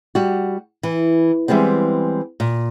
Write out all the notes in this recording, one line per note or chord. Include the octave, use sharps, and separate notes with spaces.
G3 F#4
E3
E3 G3 G#3 B3 C4
A#2